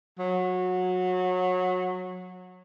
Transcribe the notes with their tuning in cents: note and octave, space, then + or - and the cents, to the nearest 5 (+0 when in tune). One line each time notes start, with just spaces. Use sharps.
F#3 -20